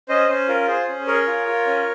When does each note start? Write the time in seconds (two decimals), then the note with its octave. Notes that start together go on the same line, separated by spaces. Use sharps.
0.08 C#4 C5 D#5
0.29 C#4 C5
0.48 F4 A#4
0.67 G#4 C5
0.88 C#4
1.07 G#4 A#4 C#5
1.27 F4
1.47 F4
1.66 C#4